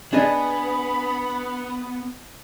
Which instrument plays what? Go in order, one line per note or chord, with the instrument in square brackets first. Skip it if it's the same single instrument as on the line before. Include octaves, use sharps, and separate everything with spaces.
[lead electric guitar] B3 [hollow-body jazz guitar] D4 G#4 D#5 [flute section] B5